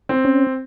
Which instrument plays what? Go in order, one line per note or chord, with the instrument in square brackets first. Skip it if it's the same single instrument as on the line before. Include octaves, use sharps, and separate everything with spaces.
[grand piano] C4
[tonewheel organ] C#4